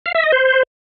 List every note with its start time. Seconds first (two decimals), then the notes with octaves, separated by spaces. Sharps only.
0.06 F5
0.15 E5
0.23 D#5
0.32 C5